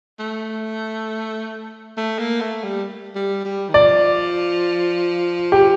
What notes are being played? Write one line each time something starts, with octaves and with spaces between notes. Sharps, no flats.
A3
A3
A#3
A3
G3
G3
G3
D#3
F3 D5
G4